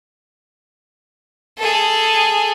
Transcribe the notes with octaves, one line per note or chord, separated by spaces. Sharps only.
G#4 A4